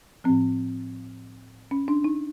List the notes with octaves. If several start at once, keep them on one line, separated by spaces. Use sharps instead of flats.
A2 F3 C4
C#4
D4
D#4